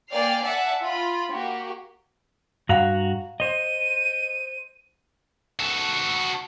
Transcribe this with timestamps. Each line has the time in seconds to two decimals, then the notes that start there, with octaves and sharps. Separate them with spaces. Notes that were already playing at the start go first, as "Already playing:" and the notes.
0.11 A#3 D5 G5 G#5 F6 C7
0.42 D5 E5 F#5 G#5 A5
0.83 F4 B5
1.31 A#3 F#4 G4
2.69 G2 F#4 F5 F#5 A#5
3.40 C5 D#5 D#7
5.60 F#4 A4